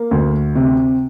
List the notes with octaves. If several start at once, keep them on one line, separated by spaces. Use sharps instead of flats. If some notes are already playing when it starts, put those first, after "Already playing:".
Already playing: A#3
D2
C3